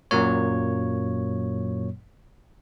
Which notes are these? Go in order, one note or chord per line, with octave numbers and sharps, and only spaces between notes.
F#2 A#2 F#3 A#3 C#5